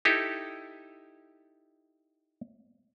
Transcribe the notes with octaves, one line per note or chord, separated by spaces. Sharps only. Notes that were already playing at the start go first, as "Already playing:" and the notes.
D#4 E4 G4 A4